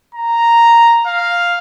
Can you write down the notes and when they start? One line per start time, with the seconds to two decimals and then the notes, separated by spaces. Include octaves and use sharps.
0.15 A#5
1.07 F5